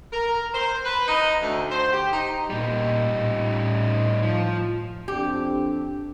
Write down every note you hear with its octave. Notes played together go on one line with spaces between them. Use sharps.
A#4
C5
B4
D#4
D2
C5
G4
D#4
A#2 G3 D#4
A2
F3
F2 C4 D4 G4